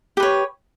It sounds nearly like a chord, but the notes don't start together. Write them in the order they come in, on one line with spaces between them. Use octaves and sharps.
G4 B4 C#5